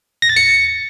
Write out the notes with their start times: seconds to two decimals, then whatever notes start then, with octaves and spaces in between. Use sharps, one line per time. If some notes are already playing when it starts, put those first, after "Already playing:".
0.22 A#6
0.29 A6
0.37 C#7